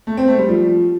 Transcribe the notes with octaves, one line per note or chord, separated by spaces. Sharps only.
A3
C4
A3
G3
F3